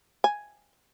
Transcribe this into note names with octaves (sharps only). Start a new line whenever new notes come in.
G#5